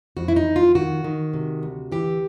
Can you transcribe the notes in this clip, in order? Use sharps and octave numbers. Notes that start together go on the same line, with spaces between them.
F2 F#4
E4
D#4
F2
F4
D#3 F#4
D#3
C3
D2
E3 G4